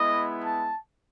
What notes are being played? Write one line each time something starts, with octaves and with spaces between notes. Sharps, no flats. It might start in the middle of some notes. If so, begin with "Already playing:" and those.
Already playing: G#3 B3 E4 D#5
A5